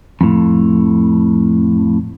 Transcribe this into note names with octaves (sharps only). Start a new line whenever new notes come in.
F2 A2